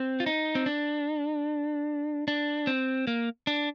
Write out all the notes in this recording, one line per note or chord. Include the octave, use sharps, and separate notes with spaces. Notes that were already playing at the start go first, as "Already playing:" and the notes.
Already playing: C4
F4
D#4
C4
D4
D4
C4
A#3
D4